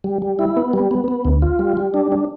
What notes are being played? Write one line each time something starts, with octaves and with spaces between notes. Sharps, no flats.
G3
G3
E4
B3
G3
B3
B3
D2
F4
G3
G3
D4
D4